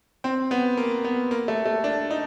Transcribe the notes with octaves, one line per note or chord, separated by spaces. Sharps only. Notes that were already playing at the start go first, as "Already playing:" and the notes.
C4
B3
A#3
B3
A#3
A3
A3
D4
D#4